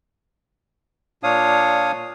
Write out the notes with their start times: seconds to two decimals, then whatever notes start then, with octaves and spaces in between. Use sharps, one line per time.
1.23 A#2 D4 C#5 F5 D#6